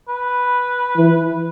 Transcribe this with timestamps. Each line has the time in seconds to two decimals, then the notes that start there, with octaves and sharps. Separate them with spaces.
0.09 B4
0.96 E3